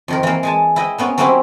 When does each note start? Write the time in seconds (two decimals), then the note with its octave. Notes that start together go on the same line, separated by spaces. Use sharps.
0.08 F2 D#3 A#4
0.23 E3 A#3
0.43 G#3 G#5 A5
0.76 E4 D#5 G5
0.98 A#3 B3 C#4
1.18 F#3 A#3 C4 C#4 E4 G4